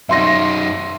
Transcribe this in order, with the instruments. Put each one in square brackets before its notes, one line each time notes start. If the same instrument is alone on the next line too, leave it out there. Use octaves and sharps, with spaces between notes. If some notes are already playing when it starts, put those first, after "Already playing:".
[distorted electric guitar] F#2 D#4 [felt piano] E5 C6 A#6